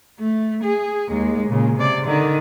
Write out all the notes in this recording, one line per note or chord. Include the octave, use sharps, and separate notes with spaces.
A3
G#4
D#2 G#3
A#2 C#3
C3 D5
D3 D#3